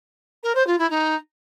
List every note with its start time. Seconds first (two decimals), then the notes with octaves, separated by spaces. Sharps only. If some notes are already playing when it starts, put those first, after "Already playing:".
0.43 A#4
0.55 C5
0.67 F4
0.78 E4
0.90 D#4